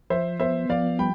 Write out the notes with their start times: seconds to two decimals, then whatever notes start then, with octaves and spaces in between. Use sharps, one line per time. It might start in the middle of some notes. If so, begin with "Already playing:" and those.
0.10 F3 C5 E5
0.40 B3 C5 E5
0.69 F3 D5 F5
0.99 G3 G5 B5